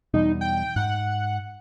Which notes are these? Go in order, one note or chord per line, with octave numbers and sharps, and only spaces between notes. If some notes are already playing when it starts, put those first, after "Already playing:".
E2 B2 G3 D#4
G5
G#2 F#5